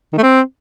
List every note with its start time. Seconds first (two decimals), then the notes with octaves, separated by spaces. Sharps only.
0.13 D#3
0.18 A3
0.23 C4